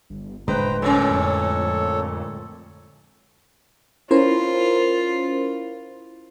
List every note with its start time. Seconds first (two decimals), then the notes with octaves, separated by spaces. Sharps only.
0.10 G1
0.48 F1 A2 D3 G#3 B4 C5 G5 A#5
0.82 A#2 A3 C#4 A4 C#5
1.10 F2
4.11 C#4 E4 F4 A#4 C5